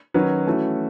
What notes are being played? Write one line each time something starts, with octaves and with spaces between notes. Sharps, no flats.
D#3 F#3 C#4 F#4 B4
E3 A3 C#4 F#4